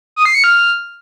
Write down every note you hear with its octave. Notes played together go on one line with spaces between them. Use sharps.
D#6
C7
C#7
F6